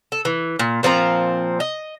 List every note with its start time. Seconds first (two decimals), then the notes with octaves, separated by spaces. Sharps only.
0.12 A4
0.25 E3
0.59 A#2
0.83 A#2 F3 C4 A#5
1.60 D#5